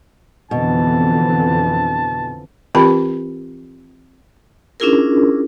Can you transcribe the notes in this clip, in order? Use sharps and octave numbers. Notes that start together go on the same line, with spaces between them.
F2 B2 D3 E3 A5
E3 C4 F4 G4 B4 B5
C#4 D4 E4 F4 G#4 A#4